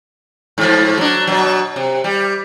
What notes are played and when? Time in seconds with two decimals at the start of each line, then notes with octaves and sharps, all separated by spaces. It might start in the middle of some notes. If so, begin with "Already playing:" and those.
0.58 G#2 F3
0.98 F#3 D4
1.27 B2 F#3
1.76 C3
2.04 G3